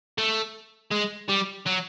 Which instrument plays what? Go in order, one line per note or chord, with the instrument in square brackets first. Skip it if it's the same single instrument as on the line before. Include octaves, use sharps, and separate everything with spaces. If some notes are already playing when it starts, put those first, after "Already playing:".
[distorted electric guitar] A3
G#3
G3
F#3